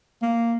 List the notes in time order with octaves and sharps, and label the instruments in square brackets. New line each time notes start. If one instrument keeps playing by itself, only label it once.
[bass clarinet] A#3